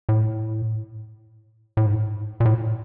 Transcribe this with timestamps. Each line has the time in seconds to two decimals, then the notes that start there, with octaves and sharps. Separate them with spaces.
0.09 A2
1.77 A2
1.86 G#2
2.40 A#2
2.45 A2